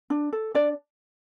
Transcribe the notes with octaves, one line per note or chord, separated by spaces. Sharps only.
D4
A4
D4 D5